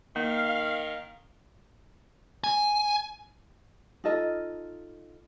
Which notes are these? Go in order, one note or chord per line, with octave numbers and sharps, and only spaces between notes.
D#3 A#3 F5
G#5
D#4 F4 A4 D#5